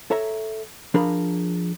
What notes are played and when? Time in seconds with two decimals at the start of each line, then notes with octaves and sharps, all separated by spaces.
0.11 A4 C#5 E5 A#5
0.94 F3 D4 G#4 A#4 B5